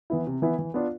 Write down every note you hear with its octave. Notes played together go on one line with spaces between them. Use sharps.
E3 B3 E4
C3
E3 B3 E4
E3
B3 D4 F4